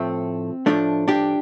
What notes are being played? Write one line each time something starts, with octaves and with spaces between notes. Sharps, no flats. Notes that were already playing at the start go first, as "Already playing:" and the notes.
Already playing: A2 F3 A3 C4
A2 F3 A3 D4
D4 G4